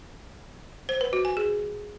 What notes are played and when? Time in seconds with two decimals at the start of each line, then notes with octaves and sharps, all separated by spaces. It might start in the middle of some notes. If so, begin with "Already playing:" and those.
0.89 C5
1.01 B4
1.13 F#4
1.25 G#5
1.37 G#4